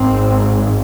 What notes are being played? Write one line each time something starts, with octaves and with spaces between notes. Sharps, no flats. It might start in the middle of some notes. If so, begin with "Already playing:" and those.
Already playing: G#1 G#2 C4